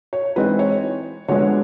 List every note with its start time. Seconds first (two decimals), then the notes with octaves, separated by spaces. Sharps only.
0.13 C#5
0.36 E3 G#3 C4 D#4 B4
0.59 C#5
1.28 D3 F3 G#3 B3 C#5